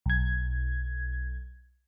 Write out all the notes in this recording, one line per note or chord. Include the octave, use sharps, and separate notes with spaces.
B1 G#6